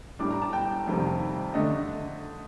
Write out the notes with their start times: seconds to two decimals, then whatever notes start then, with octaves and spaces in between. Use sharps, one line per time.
0.19 A2 G3 D4 D6
0.31 A#5
0.42 A5
0.53 G5
0.87 F2 C3 D#3 G3
1.54 D3 A3 D4 D#5